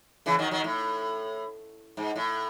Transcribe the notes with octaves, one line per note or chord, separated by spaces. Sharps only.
C#3 E3
D#3 F#3
D#3 F#3
A2
G#2
A2